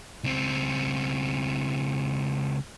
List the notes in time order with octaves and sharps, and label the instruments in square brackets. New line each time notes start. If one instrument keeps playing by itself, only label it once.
[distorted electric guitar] C#2 C4